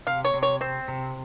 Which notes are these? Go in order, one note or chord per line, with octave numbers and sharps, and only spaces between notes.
C3 F5
C#5
C3
C#5
C4 C5
C3